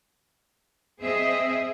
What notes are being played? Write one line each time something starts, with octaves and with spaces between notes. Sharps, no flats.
C4 G#4 D#5 E5